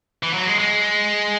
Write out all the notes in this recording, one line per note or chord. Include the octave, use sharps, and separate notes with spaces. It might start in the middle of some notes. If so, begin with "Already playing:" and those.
E3
F#3
G#3
G#3